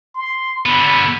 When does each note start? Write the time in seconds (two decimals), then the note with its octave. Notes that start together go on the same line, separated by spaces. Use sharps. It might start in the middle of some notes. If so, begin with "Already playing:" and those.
0.15 C6
0.66 D3 B3 B5